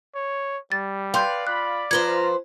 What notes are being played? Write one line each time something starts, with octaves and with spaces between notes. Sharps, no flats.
C#5
G3 A6
B4 D5 F5 G5 C6 G6
F4 D5 B5 F#6
F3 F4 B4 C5 A#5 G#6 G7